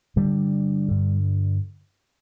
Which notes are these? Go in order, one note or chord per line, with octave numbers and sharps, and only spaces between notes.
G2 D3 G3
G2 D3